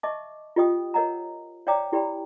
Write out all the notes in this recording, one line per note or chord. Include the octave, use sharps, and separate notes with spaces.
D#5 E5 A5 C#6 D6
F4 G4 D#5 G5 D#6
A#4 C#5 D#5 F#5 A#5
C#5 D5 F5 G5 A#5 D6
E4 G4 D5 G5 B5